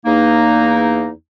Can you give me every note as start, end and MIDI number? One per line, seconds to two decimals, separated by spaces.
0.06 1.09 40
0.06 1.09 58
0.06 1.09 63